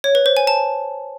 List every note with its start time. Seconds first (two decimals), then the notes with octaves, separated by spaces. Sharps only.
0.04 C#5
0.15 B4
0.26 C5
0.37 G#5
0.47 A5